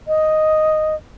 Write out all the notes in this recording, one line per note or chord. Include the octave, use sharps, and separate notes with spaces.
D#5